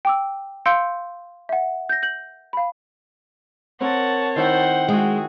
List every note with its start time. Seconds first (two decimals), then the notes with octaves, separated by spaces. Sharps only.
0.05 G5 D6 E6
0.66 F5 C6 E6 G6 C#7 D7
1.49 E5 F#5
1.89 G6 A#6
2.03 G6 F#7
2.53 F5 B5
3.81 C4 A#4 C#5 F#5 A5
4.36 D#3 E4 C5 F#5 G5
4.88 G#3 F#4 G#4